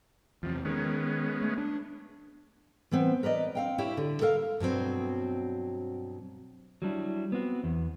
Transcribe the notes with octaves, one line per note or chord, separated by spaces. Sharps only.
E2 C3 F3
D#3 G#3 B3 C#4
A3
D4
E3 B3 C4
A#4 B4 D5 D#5
C4 F5 G5
E4 G4 C#5
D3
A4 A#4 F5
G2 B2 F#3 C4
F#3 G3 D4 E4
B3 C4 F#4
E2